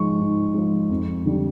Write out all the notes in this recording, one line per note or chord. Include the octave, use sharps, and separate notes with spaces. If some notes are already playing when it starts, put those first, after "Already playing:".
Already playing: G#2 F3 G#3 C#6
G#2
F3 G#3
F2
D3 G3